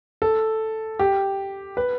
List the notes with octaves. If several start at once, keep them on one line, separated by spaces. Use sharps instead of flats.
A4
G4
B4